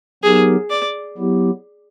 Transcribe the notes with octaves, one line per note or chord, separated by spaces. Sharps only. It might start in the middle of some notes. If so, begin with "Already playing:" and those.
F#3 B3 D#4 G4 G#4 A#4
D5
F#3 B3 E4 G4